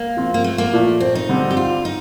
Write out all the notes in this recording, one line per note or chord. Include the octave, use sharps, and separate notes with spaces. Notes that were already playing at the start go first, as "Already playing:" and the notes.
Already playing: A#3
F3 C4 F4
A#3
A3
A#3
A#2 F3 A3
C4
D#4
D3 G3 C4
G4
F4
D#4